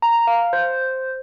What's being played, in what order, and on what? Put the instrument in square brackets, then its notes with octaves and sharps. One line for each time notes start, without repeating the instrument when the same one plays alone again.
[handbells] A#5
F5
C5